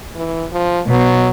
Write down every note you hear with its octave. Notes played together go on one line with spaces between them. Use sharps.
E3
F3
B2 F#3